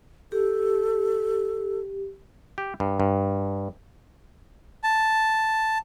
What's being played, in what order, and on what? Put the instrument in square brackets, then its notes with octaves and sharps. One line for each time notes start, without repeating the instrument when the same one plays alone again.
[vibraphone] G4 [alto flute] A4
[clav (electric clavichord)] G4
G2
G2
[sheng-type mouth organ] A5